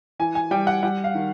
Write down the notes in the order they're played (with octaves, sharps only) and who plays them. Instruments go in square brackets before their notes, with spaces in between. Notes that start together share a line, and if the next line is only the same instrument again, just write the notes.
[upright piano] E3 G#5
G#5
G3 G5
F#5
G3 F#5
F5
D#3